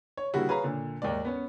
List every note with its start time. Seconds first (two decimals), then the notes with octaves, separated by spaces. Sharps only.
0.17 C#5
0.34 D3 G3 A#3 E4 F#4 G#4
0.48 G#4 B4 C#5 F5 G#5 A#5
0.63 A#2 D3
1.02 D#2 G#2 D5
1.25 B3 C#4